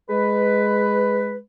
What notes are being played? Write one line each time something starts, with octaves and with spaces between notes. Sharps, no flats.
G#3 B4